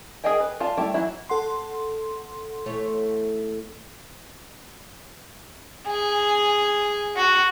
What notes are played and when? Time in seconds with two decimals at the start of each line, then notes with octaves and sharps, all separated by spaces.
0.24 G#4 A#4 D#5 G5 G#5
0.40 B4
0.60 F4 D5 F5 A5
0.77 G3 A3 E4 G5
0.94 E3 F#3 E4
1.29 A4 F#5 C6
2.66 E2 A3 C#5
5.87 G#4
7.17 F#4